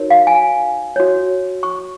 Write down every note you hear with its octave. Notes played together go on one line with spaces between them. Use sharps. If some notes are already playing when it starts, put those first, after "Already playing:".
Already playing: D#4 F#4 A#4 C#5
F5
G#5
F#4 C#5
C#6